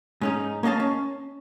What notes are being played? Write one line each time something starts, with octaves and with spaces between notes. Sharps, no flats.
G#2 C#4 D#4
A#3 C#4 D#5 F5 A5
C#4